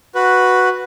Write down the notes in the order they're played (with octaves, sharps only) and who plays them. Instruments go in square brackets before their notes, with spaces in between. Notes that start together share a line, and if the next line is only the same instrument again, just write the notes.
[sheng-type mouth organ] F#4 B4